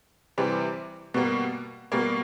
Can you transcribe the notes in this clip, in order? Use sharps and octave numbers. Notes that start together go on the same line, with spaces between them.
C3 E3 G3 C4
B2 G3 A#3
B2 G3 A#3